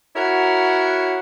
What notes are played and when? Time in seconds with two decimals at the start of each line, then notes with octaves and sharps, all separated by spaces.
0.16 E4 F#4 A#4 C#5 F#5